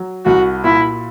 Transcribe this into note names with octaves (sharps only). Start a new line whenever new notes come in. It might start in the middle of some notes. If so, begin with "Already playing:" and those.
Already playing: F#3
C2 F#4
A#2 E4